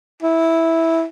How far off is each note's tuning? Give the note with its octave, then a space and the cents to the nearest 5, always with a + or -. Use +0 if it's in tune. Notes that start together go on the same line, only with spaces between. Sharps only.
E4 -10